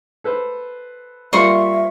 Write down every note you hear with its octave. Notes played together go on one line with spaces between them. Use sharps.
A4 B4 C5
G3 A#3 F4 C5 E5 C#6